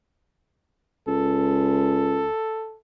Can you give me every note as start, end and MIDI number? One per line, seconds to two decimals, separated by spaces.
1.08 2.27 37
1.08 2.77 69